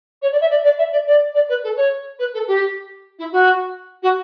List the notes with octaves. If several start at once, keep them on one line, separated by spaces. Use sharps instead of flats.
C#5
D5
E5
D5
D5
E5
D5
D5
D5
B4
A4
C#5
B4
A4
G4
E4
F#4
F#4